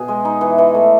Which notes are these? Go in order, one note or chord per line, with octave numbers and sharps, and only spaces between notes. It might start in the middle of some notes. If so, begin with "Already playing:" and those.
Already playing: B2 G#4
G#3
D#4
E3
E3
A3